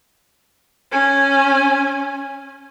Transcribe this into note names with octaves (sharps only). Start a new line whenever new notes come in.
C#4 G#5